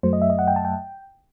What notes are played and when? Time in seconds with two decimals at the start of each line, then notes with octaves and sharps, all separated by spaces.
0.03 F#2 F#3 A3 C5
0.13 D#5
0.22 E5
0.30 D#5
0.39 F#5
0.48 G5
0.56 A5
0.65 G5